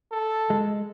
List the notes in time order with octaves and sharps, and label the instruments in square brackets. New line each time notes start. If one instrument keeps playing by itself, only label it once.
[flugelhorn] A4
[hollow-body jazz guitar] G#3